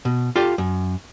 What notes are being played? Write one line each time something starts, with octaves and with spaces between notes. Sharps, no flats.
B2
F4 G4 A4 D5
F#2